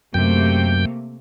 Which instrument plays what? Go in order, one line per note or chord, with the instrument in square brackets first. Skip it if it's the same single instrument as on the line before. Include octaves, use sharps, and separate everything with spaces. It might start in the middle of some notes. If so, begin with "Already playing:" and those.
[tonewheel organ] F#2 G5 [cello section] C3 A3 A#3